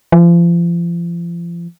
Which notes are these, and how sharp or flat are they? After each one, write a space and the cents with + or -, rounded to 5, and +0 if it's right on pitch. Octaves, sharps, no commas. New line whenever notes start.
F3 -35